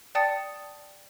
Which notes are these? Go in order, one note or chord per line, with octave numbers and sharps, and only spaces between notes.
D5 G5 A5 D#6 A6 C#7